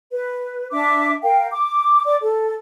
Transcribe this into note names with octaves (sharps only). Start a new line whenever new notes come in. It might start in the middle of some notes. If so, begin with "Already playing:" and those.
B4
D4 E5 D6
A#4 F5 G5
D6
D5 D6
A4